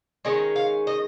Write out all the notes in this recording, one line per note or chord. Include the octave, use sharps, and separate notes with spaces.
D#3 G#3 C#4 D#5
F5
D#5